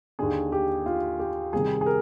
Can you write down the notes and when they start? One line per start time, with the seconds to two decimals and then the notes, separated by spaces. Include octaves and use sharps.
0.19 D#2 D3 G#4
0.52 G4
0.86 F4
1.19 G4
1.53 C2 C3 D#3 G#4
1.81 G#4
1.86 A#4